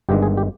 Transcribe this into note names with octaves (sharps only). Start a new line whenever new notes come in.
G1 G2 D#3 G#3 G4
G#4
G4